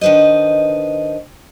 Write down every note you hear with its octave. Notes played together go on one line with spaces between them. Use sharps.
D#3 D4 B4 C5 D#5